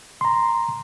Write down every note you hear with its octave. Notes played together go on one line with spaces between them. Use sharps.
A#5 C6